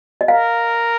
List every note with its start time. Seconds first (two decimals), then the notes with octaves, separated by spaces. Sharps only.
0.21 D#5
0.28 A#4 F5